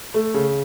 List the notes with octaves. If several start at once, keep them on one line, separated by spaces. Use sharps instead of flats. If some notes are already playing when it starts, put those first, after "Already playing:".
A3
C#3